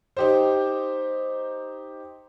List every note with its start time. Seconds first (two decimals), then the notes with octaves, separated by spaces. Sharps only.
0.17 D#4 G4 C5